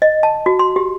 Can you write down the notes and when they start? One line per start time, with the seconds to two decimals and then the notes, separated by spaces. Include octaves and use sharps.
0.02 D#5
0.23 A5
0.46 F#4
0.59 C6
0.76 G4